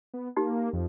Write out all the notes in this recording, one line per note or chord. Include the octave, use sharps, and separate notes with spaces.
B3
A#3 D#4 G4
F2